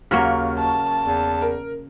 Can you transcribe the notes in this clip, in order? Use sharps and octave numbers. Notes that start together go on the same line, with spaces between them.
D#2 C#3 F#3 A#3 C#6 F6
A5
E2
A#4